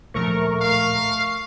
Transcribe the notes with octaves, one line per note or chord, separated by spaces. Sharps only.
D1 A#1 F3 A3 A#4 C#6
F5